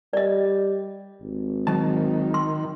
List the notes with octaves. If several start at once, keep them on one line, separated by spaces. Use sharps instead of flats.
G3 D5 D#5
G#1
D#3 F#3 A5
C6